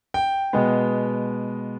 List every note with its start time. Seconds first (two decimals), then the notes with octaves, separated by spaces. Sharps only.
0.14 G5
0.53 B2 G#3 B3